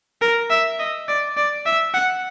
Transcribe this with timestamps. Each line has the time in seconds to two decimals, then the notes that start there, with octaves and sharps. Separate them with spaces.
0.21 A#4
0.50 E5
0.79 D#5
1.08 D5
1.37 D5
1.66 E5
1.94 F#5